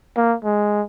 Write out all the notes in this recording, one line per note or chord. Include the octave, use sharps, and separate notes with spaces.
A#3
G#3